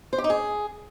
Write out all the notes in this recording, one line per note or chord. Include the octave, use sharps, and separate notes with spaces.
C5
G4
D#4
G#4